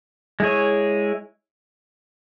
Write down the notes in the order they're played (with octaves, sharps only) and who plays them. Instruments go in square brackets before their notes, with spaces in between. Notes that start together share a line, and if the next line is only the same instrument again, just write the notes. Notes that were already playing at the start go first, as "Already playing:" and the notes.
[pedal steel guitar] G#3 E4 G#4 C#5